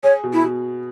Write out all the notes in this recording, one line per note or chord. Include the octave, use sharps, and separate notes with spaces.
G#4 C#5
B2
E4
B2